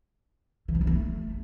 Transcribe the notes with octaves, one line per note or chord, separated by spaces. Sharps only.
E3
C4
E3
B3
A3